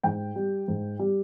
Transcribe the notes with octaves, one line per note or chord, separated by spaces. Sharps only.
G#2 G5
G3
G#2
G3